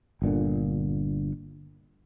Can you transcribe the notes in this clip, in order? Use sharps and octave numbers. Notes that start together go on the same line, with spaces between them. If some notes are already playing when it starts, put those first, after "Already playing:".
G1 A#2 D3